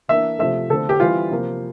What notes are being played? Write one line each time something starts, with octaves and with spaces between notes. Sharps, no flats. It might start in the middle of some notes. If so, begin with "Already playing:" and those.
E3 A#3 D4 E5
C3 F3 A3 E5
D3 A3 C4 A4
G4
E3 G3 C4 F4
C3 F3 A#3